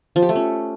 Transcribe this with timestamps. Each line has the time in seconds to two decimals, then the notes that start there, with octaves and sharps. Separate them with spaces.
0.16 F3
0.22 G4
0.29 A3
0.36 C#4